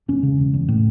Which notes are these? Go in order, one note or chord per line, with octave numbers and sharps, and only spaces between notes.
E1 C#4
C#3
E1
E2
A2